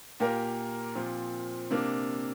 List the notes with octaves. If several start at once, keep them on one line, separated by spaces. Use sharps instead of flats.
A#2 A#3 G4 A#4
A#2 F3 C4 F4
C3 A#3 D4